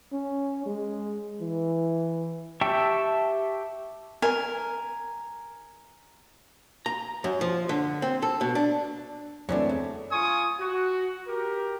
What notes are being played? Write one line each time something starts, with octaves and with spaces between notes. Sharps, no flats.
C#4
G#3
E3
G4 E5 G5 A5 C#6
A#4 G#5
A#5
F#2
F3
D3
C4
A4
B2
D4
F#2 E3 A3 C4 D4 C#5
E2
F4 G#5 C#6 D#6
F#4
G4 A#4